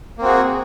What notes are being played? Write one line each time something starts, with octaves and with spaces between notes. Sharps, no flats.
A#3 C4 F#4 G#4